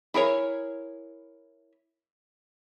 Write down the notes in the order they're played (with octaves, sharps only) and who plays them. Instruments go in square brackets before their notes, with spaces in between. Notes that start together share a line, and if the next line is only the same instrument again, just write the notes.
[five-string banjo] E4 G#4 A#4 C#5